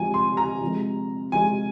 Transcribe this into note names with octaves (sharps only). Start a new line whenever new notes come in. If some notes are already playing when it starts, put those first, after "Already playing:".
Already playing: C3 F3 G#3 G#5
C6
A#5
C3 F3 G#3
C3 F3 G#3 G#5